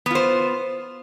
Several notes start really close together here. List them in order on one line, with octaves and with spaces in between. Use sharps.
B3 F4 C5